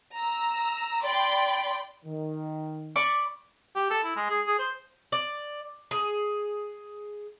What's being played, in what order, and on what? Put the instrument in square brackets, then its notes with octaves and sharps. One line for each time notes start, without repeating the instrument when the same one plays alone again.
[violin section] A#5 E6
D5 G5 B5 C6
[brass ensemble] D#3
[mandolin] D5 B5 C#6
[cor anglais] G4
A4
E4
G#3
G#4
G#4
C5
[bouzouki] D5
G#4